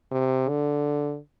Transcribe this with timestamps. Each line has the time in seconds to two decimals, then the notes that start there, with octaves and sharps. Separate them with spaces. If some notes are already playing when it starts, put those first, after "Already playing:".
0.12 C3
0.48 D3